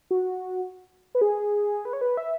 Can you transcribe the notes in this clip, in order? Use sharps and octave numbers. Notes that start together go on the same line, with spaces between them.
F#4
B4
G#4
B4
C#5
B4
E5